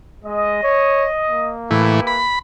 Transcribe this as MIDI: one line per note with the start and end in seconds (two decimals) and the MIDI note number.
0.25 0.59 56
0.25 1.52 75
0.63 1.08 73
1.29 2.27 58
1.71 2.00 45
1.71 2.00 52
1.71 2.17 64
1.71 2.17 67
1.71 2.17 71
2.07 2.39 83